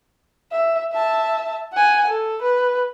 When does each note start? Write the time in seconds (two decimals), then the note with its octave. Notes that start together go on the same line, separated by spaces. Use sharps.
0.51 E5
0.92 E5 A5
1.73 F#5 G#5
2.08 A4
2.42 B4